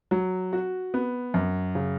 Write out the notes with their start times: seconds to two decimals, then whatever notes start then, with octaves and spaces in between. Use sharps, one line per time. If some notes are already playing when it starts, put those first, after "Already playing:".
0.11 F#3
0.53 F#4
0.94 B3
1.34 F#2
1.75 C#3